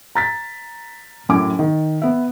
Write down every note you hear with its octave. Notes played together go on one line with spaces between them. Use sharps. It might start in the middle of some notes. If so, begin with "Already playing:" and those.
A#5 A6 B6
F#2 A2 E4 G#5 D6
D#3
B3 E5